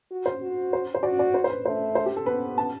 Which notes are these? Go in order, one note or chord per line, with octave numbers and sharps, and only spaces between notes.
F#4
C5
F#4
C5
C5
F#4 D5
D5
C5
C5
B4
A3 C5
C5
G4
A4
B3 B4
A5